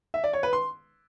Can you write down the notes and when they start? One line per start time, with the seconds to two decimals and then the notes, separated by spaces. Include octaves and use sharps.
0.14 E5
0.24 D5
0.33 C#5
0.43 B4
0.53 C6